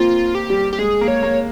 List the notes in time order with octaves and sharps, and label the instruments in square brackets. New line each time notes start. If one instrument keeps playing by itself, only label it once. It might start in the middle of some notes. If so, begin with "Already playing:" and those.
Already playing: [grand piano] A#3 C4 [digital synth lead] F4
[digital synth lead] G4
[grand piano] G3
[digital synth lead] G4
[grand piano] G#3 [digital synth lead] G#4
[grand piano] A#3
[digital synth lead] C#5
[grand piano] A#3